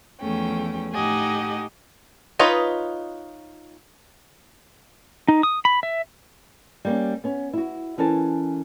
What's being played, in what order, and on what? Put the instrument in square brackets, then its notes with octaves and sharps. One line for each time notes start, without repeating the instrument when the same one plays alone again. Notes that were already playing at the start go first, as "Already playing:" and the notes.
[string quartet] E2 F3 A3 C#4 G5
A2 D#4 G4 D#5 F#5 G#5
[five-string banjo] D#4 F4 B4 C#5 D#5
[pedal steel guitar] D#4
D#6
B5
E5
[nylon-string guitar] G3 A#3 C#4
B3 C#4
E4 F#4
E3 C#4 A4 A#4 A5